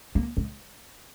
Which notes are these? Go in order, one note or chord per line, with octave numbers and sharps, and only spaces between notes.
A#3
G#3